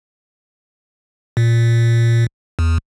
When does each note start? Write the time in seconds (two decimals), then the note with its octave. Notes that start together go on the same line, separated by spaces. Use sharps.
1.37 A#2
2.59 E2